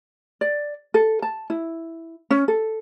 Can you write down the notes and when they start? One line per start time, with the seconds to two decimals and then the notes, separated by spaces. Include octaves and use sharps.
0.41 D5
0.94 A4
1.22 A5
1.50 E4
2.31 C#4
2.48 A4